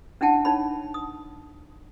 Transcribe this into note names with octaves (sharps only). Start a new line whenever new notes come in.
C#4 D4 E4 F#5 G5 A5
D#4 C#5 B5
D#6